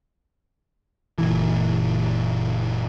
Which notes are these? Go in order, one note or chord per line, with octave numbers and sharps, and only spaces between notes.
F#1 A#2 E3